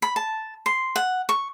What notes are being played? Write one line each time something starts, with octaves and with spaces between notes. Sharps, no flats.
B5
A5
C6
F#5
C#6